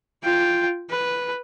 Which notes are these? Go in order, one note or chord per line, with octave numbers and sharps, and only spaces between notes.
F4 G5
B4